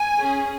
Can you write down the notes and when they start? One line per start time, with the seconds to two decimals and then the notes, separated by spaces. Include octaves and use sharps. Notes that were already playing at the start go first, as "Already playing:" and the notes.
Already playing: G#5
0.18 C#4 G#4